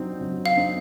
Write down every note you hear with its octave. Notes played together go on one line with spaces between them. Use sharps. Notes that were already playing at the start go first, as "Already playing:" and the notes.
Already playing: F#3 C4 D#4
F#3
F5
C4 D#4